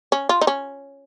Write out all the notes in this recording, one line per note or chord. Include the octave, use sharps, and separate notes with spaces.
C#4
F4
D#4
C#4